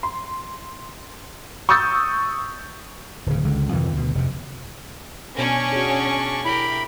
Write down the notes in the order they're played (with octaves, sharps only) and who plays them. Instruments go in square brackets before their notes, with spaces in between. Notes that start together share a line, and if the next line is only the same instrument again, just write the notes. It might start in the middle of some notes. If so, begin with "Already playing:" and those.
[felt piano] C6
C#6 D#6 E6 G6 A6
[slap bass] D1 C#3
C#2 D3
F2 C3 D#3 E3
D2 B2
F1 C3
[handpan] B2 [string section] C#4 [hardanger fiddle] D4 C#6
[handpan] F#4 G#4
[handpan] E4 [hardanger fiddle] G4 A#4 [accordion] B5